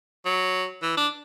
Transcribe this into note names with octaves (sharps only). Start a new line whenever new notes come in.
F#3
E3
D4